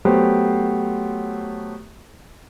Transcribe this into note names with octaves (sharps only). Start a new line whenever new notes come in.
F#3 A3 B3 G4 C5